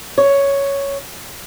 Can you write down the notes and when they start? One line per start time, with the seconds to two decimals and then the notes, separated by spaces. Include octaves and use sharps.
0.18 C#5